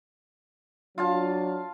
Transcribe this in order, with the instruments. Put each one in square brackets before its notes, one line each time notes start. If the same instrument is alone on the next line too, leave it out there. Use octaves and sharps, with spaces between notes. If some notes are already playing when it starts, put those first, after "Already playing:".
[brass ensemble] F#3 D4 [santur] F4 F5 A5